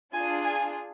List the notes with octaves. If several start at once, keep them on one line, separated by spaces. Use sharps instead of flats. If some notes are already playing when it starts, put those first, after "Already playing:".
D4 F4 G#4 G#5
G#5